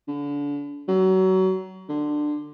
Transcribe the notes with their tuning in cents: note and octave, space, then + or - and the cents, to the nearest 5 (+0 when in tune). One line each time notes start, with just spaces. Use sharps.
D3 -30
F#3 +25
D3 +20